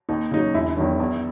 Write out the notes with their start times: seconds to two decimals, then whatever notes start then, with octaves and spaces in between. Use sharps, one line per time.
0.09 D#2 D#4
0.31 C#3 F#3 D#4
0.54 E1 E4
0.76 E2 D#3 F#3
1.00 E2